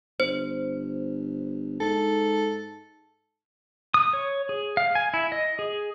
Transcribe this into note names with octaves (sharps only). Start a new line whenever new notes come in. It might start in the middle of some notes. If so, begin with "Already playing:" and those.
G1 C5
G#2 A4
D#6
C#5
G#4
F5
G#5
E4
D#5
G#4